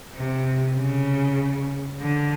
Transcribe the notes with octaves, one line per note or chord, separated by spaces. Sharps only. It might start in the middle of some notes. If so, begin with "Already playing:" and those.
C3
C#3
D3